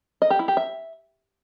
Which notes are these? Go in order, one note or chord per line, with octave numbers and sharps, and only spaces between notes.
D#5
G4
E4
G4
E5